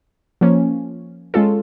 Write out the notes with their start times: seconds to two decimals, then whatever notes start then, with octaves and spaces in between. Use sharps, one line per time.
0.41 F3 A#3 C#4
1.34 G#3 C#4 F4 A4